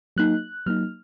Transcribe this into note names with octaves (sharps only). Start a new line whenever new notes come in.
F#3 A#3 D#4 F#6
F#3 A#3 D#4 F6